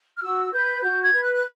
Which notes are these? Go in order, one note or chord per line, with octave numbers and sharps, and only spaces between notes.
F6
F#4 E6
B4 G6
F#4 G6
G#6
B4
F#6
F#6